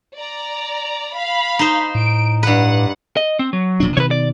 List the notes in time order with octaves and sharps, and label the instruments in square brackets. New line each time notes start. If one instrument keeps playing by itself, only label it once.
[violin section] D5 A#5
F5 B5
[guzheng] D#4 C5
[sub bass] A2 [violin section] D7
[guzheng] G2 B4 [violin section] F#5
[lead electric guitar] D#5
C4
F#3
[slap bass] E1 A#2 D4
[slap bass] B2 D#3 [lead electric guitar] B4 C#5
[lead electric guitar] D5